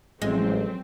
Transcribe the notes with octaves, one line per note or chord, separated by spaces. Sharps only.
A1 F3 F#3 G#3 C4